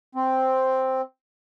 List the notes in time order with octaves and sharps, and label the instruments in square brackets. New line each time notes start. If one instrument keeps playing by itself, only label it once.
[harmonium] C4